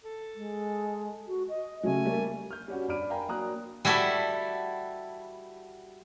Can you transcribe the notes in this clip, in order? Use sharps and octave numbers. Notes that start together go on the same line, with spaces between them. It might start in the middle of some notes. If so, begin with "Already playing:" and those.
A4
G#3
F#4
D#5
C#3 F#3 A3 G#5
G3 A#3
F6 G6
G3 C#4 F#4
G2 D4 B5 F6 D7 D#7
A#4 F5 G5 G#5 A#5 B5
F#3 A#3 D4 A#5 D#6 F#6
G3 E4 F#4 A4 E5